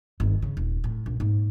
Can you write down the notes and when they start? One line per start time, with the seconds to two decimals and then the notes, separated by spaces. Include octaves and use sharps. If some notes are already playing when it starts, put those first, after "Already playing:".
0.20 G1 D#3
0.42 C#3
0.57 D#1
0.84 A2
1.06 A#1
1.20 G#2 A#3